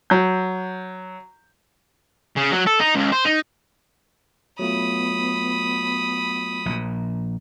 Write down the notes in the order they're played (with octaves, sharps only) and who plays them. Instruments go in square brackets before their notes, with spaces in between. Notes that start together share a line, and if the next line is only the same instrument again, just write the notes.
[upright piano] F#3 G6
[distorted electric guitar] C#3
F#3
A4
D#4
C#2
C5
D#4
[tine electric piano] F#3 A3 F4 [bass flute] B3 [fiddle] B5 D#6
[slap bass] A#1 A#2